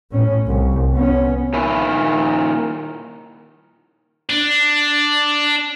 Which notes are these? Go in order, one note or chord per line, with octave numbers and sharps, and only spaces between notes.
A2 C#4
C2
B3 C#4
A#2 D#3 E4 G#5
D4